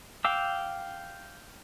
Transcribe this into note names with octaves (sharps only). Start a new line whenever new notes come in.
F5 G5 D6 E6